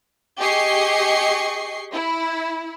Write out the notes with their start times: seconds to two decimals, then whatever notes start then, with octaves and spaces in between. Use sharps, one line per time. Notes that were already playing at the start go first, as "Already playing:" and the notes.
0.38 G4 G#4 D#5 C#6 C7
1.92 E4